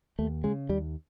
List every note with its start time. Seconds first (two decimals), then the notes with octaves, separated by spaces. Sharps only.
0.19 D#2 A3
0.44 C#3 G#3
0.69 D#2 G3